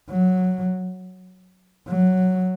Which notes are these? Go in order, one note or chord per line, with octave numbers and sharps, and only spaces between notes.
F#3
F#3